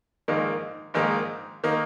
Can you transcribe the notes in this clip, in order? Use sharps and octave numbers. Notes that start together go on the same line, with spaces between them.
A#1 G#2 D#3 A#3 D#4
A#1 G#2 D#3 A#3 D#4
D#3 A#3 D#4